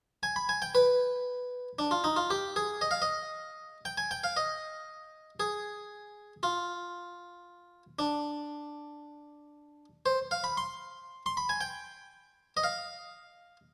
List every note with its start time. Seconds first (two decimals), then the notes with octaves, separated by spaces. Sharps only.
0.23 G#5
0.36 B5
0.49 G#5
0.62 G5
0.75 B4
1.79 D4
1.91 F4
2.04 D#4
2.16 F4
2.30 G4
2.56 G#4
2.81 D#5
2.91 F5
3.02 D#5
3.85 G5
3.98 G#5
4.11 G5
4.24 F5
4.37 D#5
5.40 G#4
6.43 F4
7.99 D4
10.06 C5
10.31 F5
10.44 B5
10.57 C6
11.26 C6
11.37 B5
11.49 G#5
11.61 G5
12.57 D#5
12.63 F5